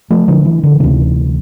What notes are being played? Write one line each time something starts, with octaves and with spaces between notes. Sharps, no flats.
F3 A3
D3 F3
E3
D3
D2 C3 E3